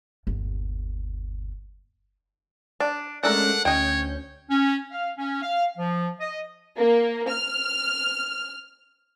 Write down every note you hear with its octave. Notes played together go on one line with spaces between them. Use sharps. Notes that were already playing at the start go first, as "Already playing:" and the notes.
G1 D#2
D4
G#3 A3 C#4 D4 A4 A#4 F#5
D2 C#4 C#5 D#5 G5 G6
C#4
F5
C#4
F5
F3
D#5
A#3
F6